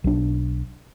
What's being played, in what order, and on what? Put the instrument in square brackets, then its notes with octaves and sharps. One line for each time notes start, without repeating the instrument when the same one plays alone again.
[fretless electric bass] B1 D4